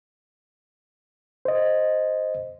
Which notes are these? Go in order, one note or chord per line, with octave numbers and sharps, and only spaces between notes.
C5 D#5